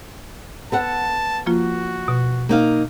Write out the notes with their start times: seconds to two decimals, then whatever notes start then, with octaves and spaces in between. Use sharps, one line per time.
0.72 B3 A4 F#5 A5
1.46 F3 A#3 F4 F#4
2.08 B2
2.49 A#3 D#4 F5